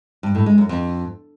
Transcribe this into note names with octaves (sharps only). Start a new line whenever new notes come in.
G2
A2
G#3
F#2
F2